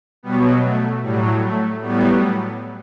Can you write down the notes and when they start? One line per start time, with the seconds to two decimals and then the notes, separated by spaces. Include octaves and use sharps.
0.23 B2 F#3 G3 B3
0.62 A3
1.02 A2 F#3 G3
1.42 A3
1.81 A2 F#3 G3 B3